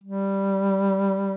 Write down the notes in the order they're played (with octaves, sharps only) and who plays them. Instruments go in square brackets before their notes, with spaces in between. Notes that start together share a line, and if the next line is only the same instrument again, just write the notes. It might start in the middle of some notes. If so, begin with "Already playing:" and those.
[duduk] G3